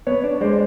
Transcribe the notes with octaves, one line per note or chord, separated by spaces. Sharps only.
B3 B4 C#5
D4
G#3 C5 D5